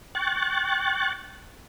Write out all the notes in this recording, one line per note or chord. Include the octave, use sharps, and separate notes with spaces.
G5 C#6 F#6 A6